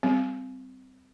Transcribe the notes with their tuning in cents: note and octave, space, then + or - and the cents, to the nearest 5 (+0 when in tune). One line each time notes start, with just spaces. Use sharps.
G3 -5 C4 -20